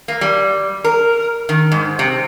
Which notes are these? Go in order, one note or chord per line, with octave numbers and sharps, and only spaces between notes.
A#3
G3
A#4
D#3
G#2
C3